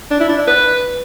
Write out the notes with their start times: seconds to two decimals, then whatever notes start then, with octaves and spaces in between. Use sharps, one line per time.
0.11 D4
0.20 E4
0.29 D4
0.38 D5
0.47 B4